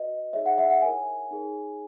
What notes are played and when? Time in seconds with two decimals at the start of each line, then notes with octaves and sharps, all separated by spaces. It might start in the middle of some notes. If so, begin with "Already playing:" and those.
Already playing: F#4 B4 D#5
0.33 D#4 G#4 C#5 E5
0.46 F#5
0.58 E5
0.70 F#5
0.82 E4 A#4 C#5 G#5
1.31 D#4 G#4 C#5